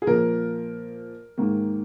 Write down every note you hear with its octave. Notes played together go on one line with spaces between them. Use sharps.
G#4
A#2 F3 A#3 A#4
G#2 D#3 A#3